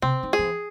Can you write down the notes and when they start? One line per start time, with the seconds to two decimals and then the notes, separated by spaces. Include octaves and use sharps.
0.02 C3 C4
0.23 D#3
0.33 G#4
0.39 F3
0.43 E3